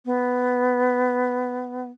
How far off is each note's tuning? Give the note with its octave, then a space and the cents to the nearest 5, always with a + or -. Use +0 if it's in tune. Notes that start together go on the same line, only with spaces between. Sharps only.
B3 +10